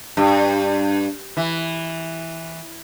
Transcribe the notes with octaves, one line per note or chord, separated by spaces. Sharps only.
G2
E3